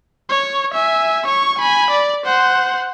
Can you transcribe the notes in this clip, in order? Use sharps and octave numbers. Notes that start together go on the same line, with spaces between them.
C#5
E5 G#5
C#5 C#6
G#5 B5
D5
C5 F#5